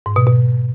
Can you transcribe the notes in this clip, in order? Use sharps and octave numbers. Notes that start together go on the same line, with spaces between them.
G#2
B2
B2